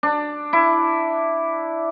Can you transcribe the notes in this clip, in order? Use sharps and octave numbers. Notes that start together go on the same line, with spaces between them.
D4
E4